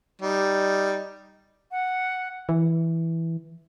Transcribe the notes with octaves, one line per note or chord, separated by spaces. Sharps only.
G3 D#4
F#5
E3